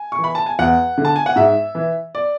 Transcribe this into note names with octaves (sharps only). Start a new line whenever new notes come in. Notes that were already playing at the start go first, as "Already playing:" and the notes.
Already playing: G#5
C#6
E3
B5
A5
G#5
E2 F#5
D3
A5
G#5
F#5
G#2 E5
E3
D5